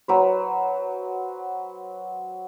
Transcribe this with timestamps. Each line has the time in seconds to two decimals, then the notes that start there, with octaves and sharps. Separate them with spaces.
0.08 F#3 B4 C5